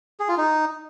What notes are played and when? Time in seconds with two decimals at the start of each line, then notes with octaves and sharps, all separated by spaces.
0.20 G#4
0.29 F4
0.37 D#4